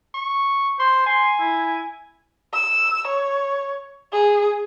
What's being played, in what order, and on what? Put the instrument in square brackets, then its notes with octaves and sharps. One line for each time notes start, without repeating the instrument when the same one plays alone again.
[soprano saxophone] C#6
[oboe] C5 [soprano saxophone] C6
[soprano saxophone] G#5 [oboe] C6
[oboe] E4
[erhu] E6
C#5
G#4